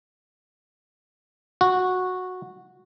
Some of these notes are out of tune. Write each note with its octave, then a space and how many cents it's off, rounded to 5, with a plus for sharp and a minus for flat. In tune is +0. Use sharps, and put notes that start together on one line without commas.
F#4 -10